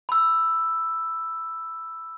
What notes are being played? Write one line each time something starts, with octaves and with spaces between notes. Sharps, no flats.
B5 E6